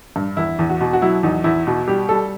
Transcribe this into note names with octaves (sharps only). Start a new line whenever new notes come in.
G2
E2 E4
E2
F#4
B2
F#4
F#3 E4
E2 D#4
E2 E4
B2
G3 G4
G3 A4